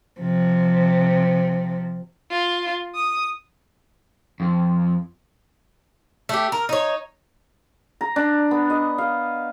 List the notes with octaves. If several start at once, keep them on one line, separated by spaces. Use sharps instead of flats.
C3 F3
F4
D#6
F2
A3 G4
A#4
D#4 C#5
A#5
D4
B3
D#5
F5